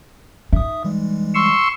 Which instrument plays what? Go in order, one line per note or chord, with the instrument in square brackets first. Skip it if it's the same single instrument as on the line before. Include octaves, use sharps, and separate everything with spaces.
[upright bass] D#4 [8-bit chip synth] E5 D#6
[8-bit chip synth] E3 G3 G#3
[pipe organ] C6 C#6 E6